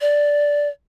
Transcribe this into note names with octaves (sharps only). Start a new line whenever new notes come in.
D5